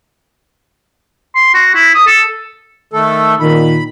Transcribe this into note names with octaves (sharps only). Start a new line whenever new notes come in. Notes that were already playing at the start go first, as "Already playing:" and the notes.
C6
F#4
E4
D#6
A4
D#3 A3 A4
A#2 D#3 B5